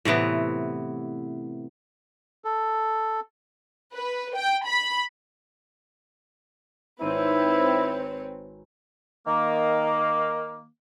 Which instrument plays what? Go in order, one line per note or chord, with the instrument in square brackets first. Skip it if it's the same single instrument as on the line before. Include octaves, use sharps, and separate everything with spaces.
[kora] A2 C3 E3 B3
[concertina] A4
[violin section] B4
G5
B5
[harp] G#1 D#4 D#7 [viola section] C4 [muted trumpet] E4 [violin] B4 C#5
[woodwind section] D#3 A#3